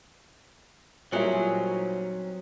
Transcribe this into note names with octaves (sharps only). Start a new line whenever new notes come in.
A#2 F#3 G3 C4 C#4 D#4 E4